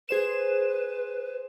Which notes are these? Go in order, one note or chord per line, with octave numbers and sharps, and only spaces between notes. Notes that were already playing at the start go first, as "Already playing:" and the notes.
G#4 B4 C5 E7